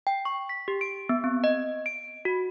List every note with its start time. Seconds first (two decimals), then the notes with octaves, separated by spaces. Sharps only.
0.07 G5
0.25 C#6
0.49 B6
0.68 G4
0.81 D7
1.09 B3
1.24 C4
1.44 D#5
1.86 D7
2.25 F#4